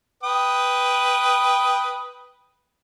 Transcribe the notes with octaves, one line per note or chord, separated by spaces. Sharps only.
B4 G5 D#6